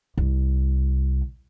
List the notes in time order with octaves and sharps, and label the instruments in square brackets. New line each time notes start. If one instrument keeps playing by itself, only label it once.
[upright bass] C2